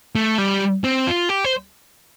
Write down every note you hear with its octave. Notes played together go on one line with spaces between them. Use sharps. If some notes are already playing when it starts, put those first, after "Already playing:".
A3
G3
C4
F4
G4
C5